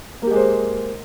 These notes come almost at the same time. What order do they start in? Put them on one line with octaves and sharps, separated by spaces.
A#3 G4 G#3 C5